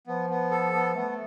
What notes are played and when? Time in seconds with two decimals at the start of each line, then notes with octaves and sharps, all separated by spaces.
0.07 F3 B3
0.30 B3
0.51 A4
0.74 B3
0.96 A3 B3